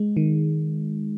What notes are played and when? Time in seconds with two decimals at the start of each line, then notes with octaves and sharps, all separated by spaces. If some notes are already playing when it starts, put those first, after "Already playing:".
Already playing: G#3
0.17 D#3